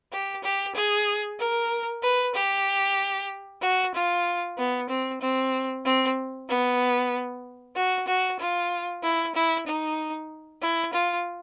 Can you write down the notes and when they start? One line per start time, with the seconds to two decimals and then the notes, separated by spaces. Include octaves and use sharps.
0.12 G4
0.43 G4
0.75 G#4
1.39 A#4
2.03 B4
2.35 G4
3.62 F#4
3.94 F4
4.58 B3
4.89 C4
5.21 C4
5.85 C4
6.49 B3
7.76 F#4
8.07 F#4
8.39 F4
9.03 E4
9.35 E4
9.67 D#4
10.62 E4
10.93 F4